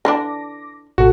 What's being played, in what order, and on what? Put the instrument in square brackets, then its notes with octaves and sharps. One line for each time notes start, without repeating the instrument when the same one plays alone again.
[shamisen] D3 E3 D4 [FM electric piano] D6 A#6
[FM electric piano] A1 A#2 A4 [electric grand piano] F#4